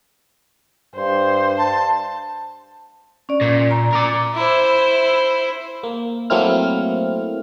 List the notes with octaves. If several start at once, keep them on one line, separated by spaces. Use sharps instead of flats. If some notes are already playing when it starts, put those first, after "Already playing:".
G2 C5
A5
C#4 D5
A#2
A#5
A#4 D5
E4 C5
A#3
F#3 A3 A#3 C4 E4 F6